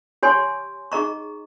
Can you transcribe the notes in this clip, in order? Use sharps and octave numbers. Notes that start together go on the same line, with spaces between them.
G4 C#5 G#5 C6
D#4 G#4 D#5 A#5 C#6